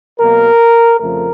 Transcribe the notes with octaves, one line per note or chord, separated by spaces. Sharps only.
B2 F#3 A#3 A#4
F2 C#3 F3 A3 A#4